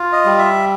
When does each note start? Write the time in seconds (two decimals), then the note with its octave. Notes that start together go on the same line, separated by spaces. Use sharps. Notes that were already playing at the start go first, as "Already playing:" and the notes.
Already playing: F4
0.13 D#5
0.25 G3
0.38 E5